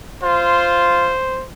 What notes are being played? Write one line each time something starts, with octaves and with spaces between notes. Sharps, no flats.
F4 C5